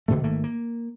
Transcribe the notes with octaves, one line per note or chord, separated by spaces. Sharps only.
B1 B2 D3 A3
G#1 D#3 A3 A#3
A#3